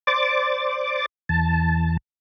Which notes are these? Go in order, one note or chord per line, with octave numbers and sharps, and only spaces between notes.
C5 D5 D6 A6
E2 A5